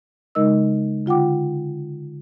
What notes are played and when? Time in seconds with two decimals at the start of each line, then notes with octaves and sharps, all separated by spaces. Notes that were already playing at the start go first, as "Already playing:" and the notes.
0.35 C#3 G#3 D#4 A#4 D#5 E6
1.06 D3 F4 F#5 G5 D6